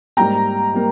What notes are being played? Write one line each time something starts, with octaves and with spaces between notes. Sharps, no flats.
G#2 G3 A#3 G5 A#5
G3 A#3